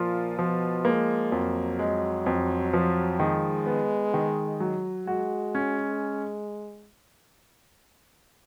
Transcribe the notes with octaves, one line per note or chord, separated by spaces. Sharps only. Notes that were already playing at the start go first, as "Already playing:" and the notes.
Already playing: A#2 F3 F4
B2 F3
G#3 A#3
F2 F#3
G#3
F2
F3
D#3 G#3
B3
D#3
F#3
G#3 F#4
C#4